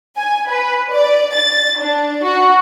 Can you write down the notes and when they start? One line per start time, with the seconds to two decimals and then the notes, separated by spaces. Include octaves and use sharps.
0.16 G#5
0.49 B4
0.91 D5
1.36 A6
1.79 D4
2.24 F#4